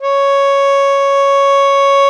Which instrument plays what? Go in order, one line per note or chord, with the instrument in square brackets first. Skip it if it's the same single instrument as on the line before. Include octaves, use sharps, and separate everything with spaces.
[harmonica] C#5